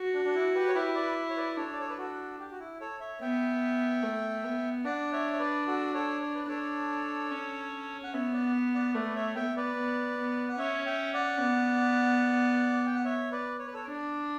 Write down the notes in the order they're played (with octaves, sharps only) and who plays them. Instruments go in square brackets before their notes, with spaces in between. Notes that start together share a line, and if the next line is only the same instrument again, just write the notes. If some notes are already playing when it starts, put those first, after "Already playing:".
Already playing: [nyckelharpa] F#4
[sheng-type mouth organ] D4
D4
E4
G4 B4
C#5
[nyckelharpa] E4 [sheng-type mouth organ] G4 B4
[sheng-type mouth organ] B4 D5
C#5
B4 D5
[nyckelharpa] D4 [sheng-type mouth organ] A4 C#5
[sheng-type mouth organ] D5
C#5
B4
F#4 A4
G4
F#4
E4
A4 C#5
C#5 E5
[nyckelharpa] B3 [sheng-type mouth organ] E5 G5
[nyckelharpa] A3
B3
[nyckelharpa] D4 [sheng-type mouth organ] D5 F#5
[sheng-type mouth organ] C#5 E5
C#5
B4 D5
F#4 A4
A4 C#5
C#5
B4
[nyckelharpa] D4 [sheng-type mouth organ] A4 C#5
[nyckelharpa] C#4
[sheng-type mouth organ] F#5
[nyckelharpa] B3 [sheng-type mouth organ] C#5 E5
[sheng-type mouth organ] D5 F#5
D5 F#5
[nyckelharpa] A3 [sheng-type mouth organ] B4 D5
[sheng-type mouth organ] C#5 E5
[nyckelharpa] B3 [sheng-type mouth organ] E5 G5
[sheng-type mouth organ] B4 D5
[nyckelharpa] B3
B3
[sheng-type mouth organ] F#5
[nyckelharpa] C#4 [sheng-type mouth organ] C#5 E5
[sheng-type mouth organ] E5 G5
D5 F#5
[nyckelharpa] B3
[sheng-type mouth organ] G5
F#5
C#5 E5
B4 D5
C#5
B4
A4 C#5
[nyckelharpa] D4